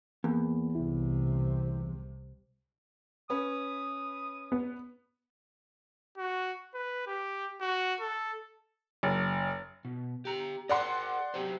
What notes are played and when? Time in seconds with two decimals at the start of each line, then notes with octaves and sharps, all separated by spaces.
0.24 E2 A#3
0.75 C2 C3 E4
3.30 C#4 B4 D#6
4.52 B3
6.18 F#4
6.75 B4
7.07 G4
7.61 F#4
8.00 A4
9.03 F#1
9.85 B2
10.25 G4 A#5
10.69 G#4 A#4 D5 F#5 C6
11.34 F#3 G4 C5